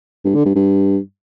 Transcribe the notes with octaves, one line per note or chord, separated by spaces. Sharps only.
G2
D3
G2
G2